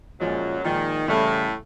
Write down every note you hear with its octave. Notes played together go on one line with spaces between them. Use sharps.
F#2 A#2 F3 F#3 G#3
A#2 D#3 F3 G#3
A2 C#3 E3 G3 A3